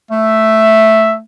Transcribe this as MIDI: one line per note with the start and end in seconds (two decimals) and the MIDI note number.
0.11 1.20 57
0.11 1.15 76